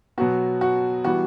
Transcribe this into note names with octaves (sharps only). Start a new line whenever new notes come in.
B2 F#3 B3 F#4
F#4
E3 G3 B3 F#4